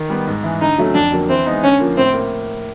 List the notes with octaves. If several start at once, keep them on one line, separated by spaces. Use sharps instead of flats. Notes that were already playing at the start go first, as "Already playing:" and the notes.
Already playing: D#3
G3 B3
G#2
E3 G#3
D3 D#4
F#3 A3 C#4
F2 D4
D3 F#3 A#3
E3 C4
G#3 B3 D#4
D3 C#4
F3 A#3
A2 C4
A#3